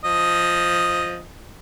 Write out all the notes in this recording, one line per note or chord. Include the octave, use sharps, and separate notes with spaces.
F3 D#5